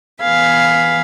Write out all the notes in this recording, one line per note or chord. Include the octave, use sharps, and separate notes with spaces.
E3 B3 G#4 F5 B5 G#6